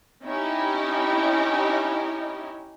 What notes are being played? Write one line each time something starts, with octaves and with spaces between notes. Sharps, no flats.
C#4 D#4 E4 G4